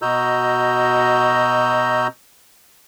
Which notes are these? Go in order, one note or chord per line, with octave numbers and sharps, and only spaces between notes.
B2 F#4 D#5 A#5 E6 G6